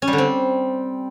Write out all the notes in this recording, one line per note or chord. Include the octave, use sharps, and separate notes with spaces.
C#4
G3
D3
C4